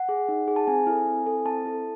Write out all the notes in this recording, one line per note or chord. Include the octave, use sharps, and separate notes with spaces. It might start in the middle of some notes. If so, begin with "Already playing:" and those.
Already playing: F#5
G#4
D#4
G#4
A5
C4 G#5
E4 A4
C4
E4 A4
C4 A5
E4 A4